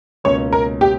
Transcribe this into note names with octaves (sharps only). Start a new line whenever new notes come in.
C#2 B2 A#3 C#4 C#5
A#4
G4